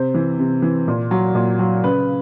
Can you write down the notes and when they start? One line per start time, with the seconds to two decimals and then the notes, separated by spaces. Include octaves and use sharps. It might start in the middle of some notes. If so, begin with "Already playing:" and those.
Already playing: C3 C5
0.14 E3
0.39 C3
0.62 E3
0.88 A#2
1.11 F#3
1.35 A#2
1.59 F#3
1.84 C#3 B4